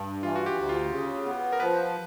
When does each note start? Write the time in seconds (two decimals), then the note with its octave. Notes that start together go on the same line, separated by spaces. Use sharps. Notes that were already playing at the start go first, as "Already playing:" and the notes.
Already playing: G2
0.23 E3 F4
0.36 F#4
0.46 G4
0.57 D2
0.69 F4
0.91 C#3
1.26 B3
1.53 A#4
1.60 F3 B4